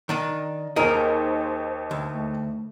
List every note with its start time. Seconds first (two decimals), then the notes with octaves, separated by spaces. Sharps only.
0.09 D#3 D4 D#4
0.76 D#2 D#4 G#4 A#4 C5
1.91 D2
2.12 A3